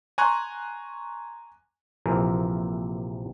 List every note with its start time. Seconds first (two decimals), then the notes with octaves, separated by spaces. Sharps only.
0.18 G#5 A#5 C6 C#6 F#6 G#6
2.06 A#1 C3 E3 F3 G#4 A#4